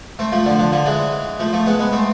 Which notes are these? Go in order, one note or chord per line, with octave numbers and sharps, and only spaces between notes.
A3 C4
F3 A3
D3 F3
D3 F3
D3 F3
E3 G#3
F3 A3
F3 A3
G#3 B3
G#3 B3
A3 C4